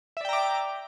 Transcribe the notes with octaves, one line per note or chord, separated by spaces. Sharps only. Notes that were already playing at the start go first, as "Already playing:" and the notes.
D5 E5 G5 A#5 D6